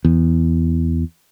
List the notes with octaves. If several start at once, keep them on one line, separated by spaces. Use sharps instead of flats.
E2